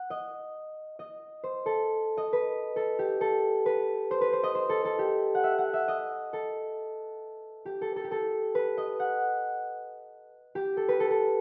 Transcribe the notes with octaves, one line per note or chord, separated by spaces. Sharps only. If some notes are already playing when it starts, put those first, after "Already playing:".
Already playing: F#5
D#5
D#5
C5
A4
D#5
B4
A4
G4
A4
B4
C5
B4
C5
D#5
C5
A4
A4
G4
F#5
E5
F#5
E5
D#5
A4
G4
A4
A4
G4
A4
B4
D#5
F#5
G4
A4
B4
A4
A4